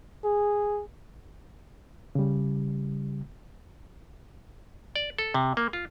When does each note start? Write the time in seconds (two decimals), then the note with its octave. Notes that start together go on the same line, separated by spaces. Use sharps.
0.24 G#4
2.15 C#3 G3
4.96 D5
5.18 A4
5.34 C3
5.57 A#3
5.73 F4